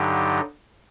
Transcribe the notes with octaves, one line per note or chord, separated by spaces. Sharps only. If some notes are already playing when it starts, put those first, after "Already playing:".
Already playing: G2 D3 F#3 D#4 G4